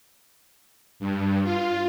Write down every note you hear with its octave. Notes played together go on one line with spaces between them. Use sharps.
G2
F4